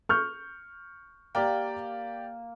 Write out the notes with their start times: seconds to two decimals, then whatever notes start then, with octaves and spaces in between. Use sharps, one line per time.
0.09 C#6 F6 G6
1.35 A#3 G4 D5 G5